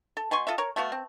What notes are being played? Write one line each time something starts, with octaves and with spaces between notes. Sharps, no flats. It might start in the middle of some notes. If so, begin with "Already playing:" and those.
A4
B2 G#5 C6 C#6
F4 A4 D#5 E5
A#4 C#5
A3 B3 F#4 F5
C4